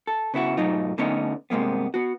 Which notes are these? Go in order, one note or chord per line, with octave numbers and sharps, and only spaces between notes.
A4
C#3 B3 E4 F#4
B1 G#2 F#3 A3 D#4 F4
D3 A3 B3 C#4 D#4
G2 C3 G#3 A#3 B3
B3 F#4